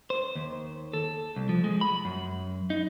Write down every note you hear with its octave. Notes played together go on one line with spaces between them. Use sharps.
C5
D#2
A4
C2
F3
G#3
B5
F#2
D#4